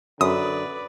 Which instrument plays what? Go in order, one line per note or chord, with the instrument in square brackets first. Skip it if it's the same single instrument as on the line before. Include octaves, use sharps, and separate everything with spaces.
[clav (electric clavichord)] F#2 [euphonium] D3 [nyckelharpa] B4 D5 [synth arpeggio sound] D#6